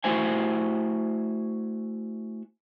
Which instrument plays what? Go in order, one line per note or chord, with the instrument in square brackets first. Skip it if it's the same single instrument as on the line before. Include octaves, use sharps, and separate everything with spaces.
[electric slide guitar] A3 E4 F#4 C5 E5 G#5